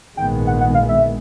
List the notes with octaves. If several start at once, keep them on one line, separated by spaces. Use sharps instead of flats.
A#1 G#2 D#3 G#3 B3 G5
F#5
F#5
F5
E5